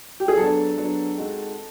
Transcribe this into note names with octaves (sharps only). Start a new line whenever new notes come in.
G4
G#4
F#3 B3 D4 A4
F#3 B3 D4
G#3 C4 D#4 F#4